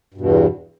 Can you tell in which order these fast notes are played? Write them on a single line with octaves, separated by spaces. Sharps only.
G2 B2 E2